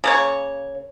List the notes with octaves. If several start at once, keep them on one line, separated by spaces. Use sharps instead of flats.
C#3 A#3 C#5